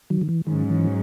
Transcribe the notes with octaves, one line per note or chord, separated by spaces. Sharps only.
D#3 F#3
D#3
E3
G#2 D#3 F#3 C#4
E3